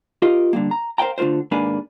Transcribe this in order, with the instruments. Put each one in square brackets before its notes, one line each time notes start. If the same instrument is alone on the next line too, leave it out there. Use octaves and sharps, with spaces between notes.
[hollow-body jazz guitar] F4 G4 A#4 D#5
D3 G3 A#3
A#5
A#4 C5 D5 F5 G5 A#5
D3 A3 F4 A#4 C5
D#2 G#2 A#3 D4 B4 G#5